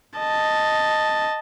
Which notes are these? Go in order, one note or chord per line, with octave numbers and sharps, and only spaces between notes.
D#5 A5